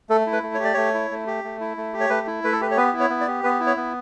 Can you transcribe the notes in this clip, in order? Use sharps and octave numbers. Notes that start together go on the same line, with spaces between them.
A3 A4
E4
B4
A3
C#5
G4 D5
A3 C#5
E4
A3
G4
A3
E4
A3
G4
C#5
A3 B4
E4
A3 B4
A4
G4 B4
C#5
B3 B4
E4
C#5
B3
D5
G4
B3 B4
E4
C#5
B3